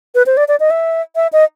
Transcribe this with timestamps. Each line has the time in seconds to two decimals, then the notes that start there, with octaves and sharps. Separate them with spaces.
0.15 B4
0.26 C5
0.37 D5
0.48 D5
0.60 D#5
0.70 E5
1.16 E5
1.33 D#5